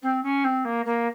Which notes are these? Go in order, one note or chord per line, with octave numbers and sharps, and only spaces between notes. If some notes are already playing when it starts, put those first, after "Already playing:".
C4
C#4
C4
A#3
A#3